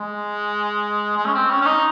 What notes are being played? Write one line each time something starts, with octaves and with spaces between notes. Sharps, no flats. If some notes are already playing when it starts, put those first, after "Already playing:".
Already playing: G#3
G#3
C#4
C4
C#4
C#4
D#4